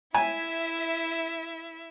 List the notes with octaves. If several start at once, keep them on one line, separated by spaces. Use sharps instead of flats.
E4 E5 G#5